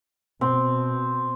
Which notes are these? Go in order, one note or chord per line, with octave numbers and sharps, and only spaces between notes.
B2 C4